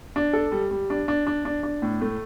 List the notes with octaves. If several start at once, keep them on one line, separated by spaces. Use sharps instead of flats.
D4
A4
G3
G3
D4
D4
D4
D4
D4
A2
A3